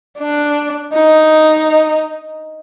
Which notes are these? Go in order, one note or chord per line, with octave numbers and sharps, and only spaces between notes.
D4
D#4